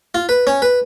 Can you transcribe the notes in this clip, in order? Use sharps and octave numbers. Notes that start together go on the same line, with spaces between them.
F4
B4
C#4
B4